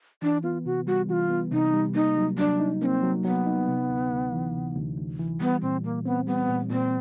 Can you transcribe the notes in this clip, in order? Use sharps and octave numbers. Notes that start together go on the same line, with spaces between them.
E3 D4
B3 F4
C3 F#4
G3 F#4
E3 F4 F#4
B3
C3 D#4
G3
A#3 D#4
F#3
F#3 D4
D#4
A#3 C4 C#4
F#3
F#3 B3
D#4
C3
D2
D2
E3
C3
D2
D2
E3
G3 B3
A#2 C4
A#2 A#3
B3 C4
G3 B3
A#2
A#2 C4